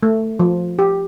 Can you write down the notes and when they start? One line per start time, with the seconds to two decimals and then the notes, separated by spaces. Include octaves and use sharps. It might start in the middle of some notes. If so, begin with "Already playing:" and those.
0.03 A3
0.39 F3
0.79 G4